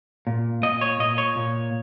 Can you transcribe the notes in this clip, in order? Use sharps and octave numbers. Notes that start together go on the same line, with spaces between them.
A#2
A#2 D#5
C#5
A#2 D#5
C#5
A#2